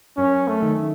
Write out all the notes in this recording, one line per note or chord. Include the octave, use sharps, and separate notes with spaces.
F#2 C#4
A3
D#3